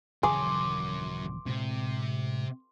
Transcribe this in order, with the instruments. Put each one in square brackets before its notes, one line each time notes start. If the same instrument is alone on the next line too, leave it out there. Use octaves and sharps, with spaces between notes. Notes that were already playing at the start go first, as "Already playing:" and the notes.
[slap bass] D#1 C#3 E3 [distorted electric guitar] F#2 [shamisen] G#4 [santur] C6 D6
[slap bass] A2 G#3 C4 [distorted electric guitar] C3